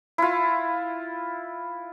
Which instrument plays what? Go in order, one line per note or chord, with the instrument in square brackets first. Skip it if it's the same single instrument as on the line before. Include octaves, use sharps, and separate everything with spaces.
[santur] E4 F4